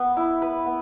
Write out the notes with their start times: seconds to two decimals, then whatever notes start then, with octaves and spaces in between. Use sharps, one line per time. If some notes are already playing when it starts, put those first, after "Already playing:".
Already playing: B3
0.17 E4
0.42 B4
0.66 B3